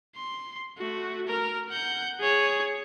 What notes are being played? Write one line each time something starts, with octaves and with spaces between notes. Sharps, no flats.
C6
A3 F#4
A#4 F6
F#5 G6
G#4 C#5